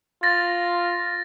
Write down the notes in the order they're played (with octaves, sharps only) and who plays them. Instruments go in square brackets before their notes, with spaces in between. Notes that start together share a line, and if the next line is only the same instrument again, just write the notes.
[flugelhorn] F4 [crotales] A6 A#6